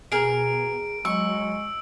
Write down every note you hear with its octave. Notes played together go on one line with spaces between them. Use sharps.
B2 G#4 A#4 D7
F#3 G#3 C#6 E6